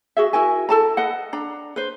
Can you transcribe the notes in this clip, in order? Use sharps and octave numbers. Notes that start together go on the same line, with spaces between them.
F#4 G#4 E5
E4 F#4 A#4 G#5
E4 A4 A5 A#5
B4 D#5 F#5
D4 A#5
B4 C5